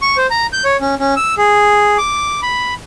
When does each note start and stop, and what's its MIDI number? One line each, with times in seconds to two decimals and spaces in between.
0.02 0.17 85
0.17 0.27 72
0.31 0.47 82
0.53 0.64 91
0.64 0.77 73
0.81 0.95 61
0.99 1.14 61
1.16 1.35 88
1.38 1.97 68
1.98 2.41 86
2.42 2.74 83